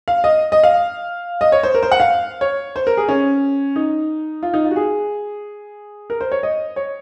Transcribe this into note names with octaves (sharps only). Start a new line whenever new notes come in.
F5
D#5
D#5
F5
D#5
C#5
C5
A#4
C5
F#5
F5
C#5
C5
A#4
G#4
C#4
D#4
F4
D#4
F4
F#4
G#4
A#4
C5
C#5
D#5
C#5